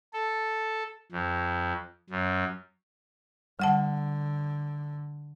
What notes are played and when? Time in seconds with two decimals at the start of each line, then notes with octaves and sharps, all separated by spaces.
0.13 A4
1.12 F2
2.10 F#2
3.59 D3 G3 F#5 A5